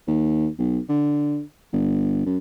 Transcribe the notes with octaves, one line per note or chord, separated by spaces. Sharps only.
D#2
B1
D3
G1
F#2